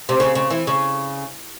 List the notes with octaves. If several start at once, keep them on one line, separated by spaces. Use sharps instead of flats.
C3
C#3
C#3
E3
C#3